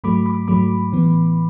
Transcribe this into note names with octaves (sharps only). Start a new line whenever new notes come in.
G#2 F#3 A3 B5 D6
B5 D6
G#2 F#3 A3 B5 D6
A2 E3 B3